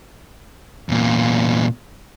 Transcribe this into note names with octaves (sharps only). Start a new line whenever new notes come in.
E2 A#2